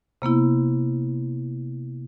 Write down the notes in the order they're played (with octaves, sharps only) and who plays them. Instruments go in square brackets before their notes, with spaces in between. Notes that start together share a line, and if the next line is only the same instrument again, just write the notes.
[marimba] C3 A#3 B3 E4